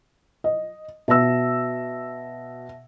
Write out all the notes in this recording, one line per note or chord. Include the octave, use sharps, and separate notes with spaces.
D#5
B2 E5 A5 E6 A#6